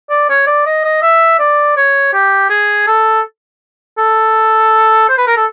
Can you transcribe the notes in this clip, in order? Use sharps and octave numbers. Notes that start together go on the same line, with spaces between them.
D5
C#5
D5
D#5
D#5
E5
D5
C#5
G4
G#4
A4
A4
C5
B4
A#4
A4